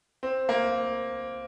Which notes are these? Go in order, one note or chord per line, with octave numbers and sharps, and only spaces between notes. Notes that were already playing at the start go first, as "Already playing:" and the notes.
C4
A#3